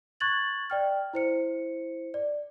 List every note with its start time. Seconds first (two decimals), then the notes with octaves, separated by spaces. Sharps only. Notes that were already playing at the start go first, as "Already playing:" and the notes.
0.20 C#6 F#6 G#6 A6 F#7
0.70 D5 G5 F6
1.13 E4 C5 C#7
2.14 D5